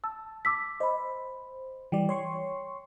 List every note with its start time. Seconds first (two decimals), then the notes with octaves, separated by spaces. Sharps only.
0.04 A5 E6
0.45 D6 E6 B6
0.80 C5 D#5 B5
1.92 E3 G3 D5 G5
2.09 C#5 C6 C#6